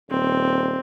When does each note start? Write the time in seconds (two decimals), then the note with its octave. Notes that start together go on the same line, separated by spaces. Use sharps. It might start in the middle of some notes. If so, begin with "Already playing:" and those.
0.10 D#1 C4